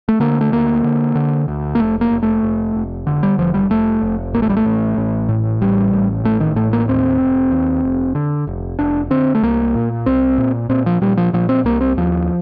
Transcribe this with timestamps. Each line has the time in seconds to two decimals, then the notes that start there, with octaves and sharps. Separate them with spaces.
0.09 A3
0.20 D3 A#3
0.41 A3
0.52 D2 A#3
0.84 D3
1.15 D3
1.48 D2
1.75 A#3
1.80 F1 A3
2.01 A#3
2.11 F1
2.23 A3
2.43 F1
2.75 F1
3.07 D3
3.23 G3
3.39 F1 F3
3.54 G3
3.70 F1 A3
4.02 F1
4.33 A1 A#3
4.42 A3
4.49 G3
4.57 A3
4.65 A1
4.97 A1
5.29 A2
5.61 A1 G3
5.93 A2
6.25 A1 A3
6.40 D#3
6.56 A2 A3
6.73 A#3
6.88 D#2 C4
7.20 F1
7.52 D#2
7.84 F1
8.15 D3
8.47 F1
8.79 F1 D4
9.10 D3 C4
9.35 A3
9.43 C2 A#3
9.75 A#2
10.06 C2 C4
10.38 A#2
10.69 A#2 C4
10.86 F3
11.01 A#2 G3
11.17 F3
11.33 A#2 F3
11.49 C4
11.65 C2 A#3
11.81 C4
11.97 D#2 F3